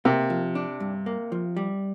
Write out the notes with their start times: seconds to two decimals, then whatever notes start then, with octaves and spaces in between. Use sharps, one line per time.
0.05 C3 A#3
0.30 F3
0.55 D4
0.80 G2
1.06 A#3
1.32 F3
1.57 G3